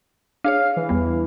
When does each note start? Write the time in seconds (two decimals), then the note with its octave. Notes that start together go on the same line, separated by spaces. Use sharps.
0.44 D4 G#4 C#5 F5
0.77 E3
0.89 E2 G3 B3